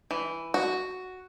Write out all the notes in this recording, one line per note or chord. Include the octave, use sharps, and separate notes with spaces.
E3
F#4